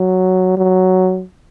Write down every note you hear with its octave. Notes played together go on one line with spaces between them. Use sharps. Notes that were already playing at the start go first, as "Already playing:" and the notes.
Already playing: F#3
F#3